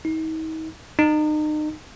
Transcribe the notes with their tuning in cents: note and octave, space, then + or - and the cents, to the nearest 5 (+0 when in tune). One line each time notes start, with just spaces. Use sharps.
D#4 +40
D#4 -35